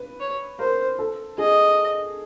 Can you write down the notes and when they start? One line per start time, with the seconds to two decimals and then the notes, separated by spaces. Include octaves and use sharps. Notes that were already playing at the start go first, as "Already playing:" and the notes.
Already playing: B4
0.20 C#5
0.59 A#4 C5
0.99 A4
1.38 G#4 D#5